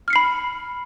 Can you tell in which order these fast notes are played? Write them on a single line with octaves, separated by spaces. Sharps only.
F6 C#7 C7 B5